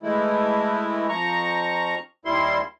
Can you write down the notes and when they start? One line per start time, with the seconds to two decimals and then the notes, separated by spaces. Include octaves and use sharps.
0.03 E3 G#3 A3 E4
1.09 F2 F3 A#5 C#6
2.25 D#2 G3 E4 C6